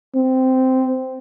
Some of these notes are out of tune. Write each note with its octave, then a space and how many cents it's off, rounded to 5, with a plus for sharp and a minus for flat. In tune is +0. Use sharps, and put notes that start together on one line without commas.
C4 -10